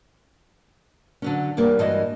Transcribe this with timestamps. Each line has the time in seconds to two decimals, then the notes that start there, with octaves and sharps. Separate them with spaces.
1.22 D3 F#3 C#4
1.57 E2 G3 A#3
1.79 G2 E3 G#3 F#4 D#5